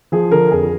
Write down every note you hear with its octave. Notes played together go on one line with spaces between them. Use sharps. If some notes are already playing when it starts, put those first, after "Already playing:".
F3 G#4
D3 A#4
F2 G#4